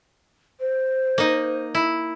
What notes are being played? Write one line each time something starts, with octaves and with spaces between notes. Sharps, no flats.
C5
A#3 D#4
E4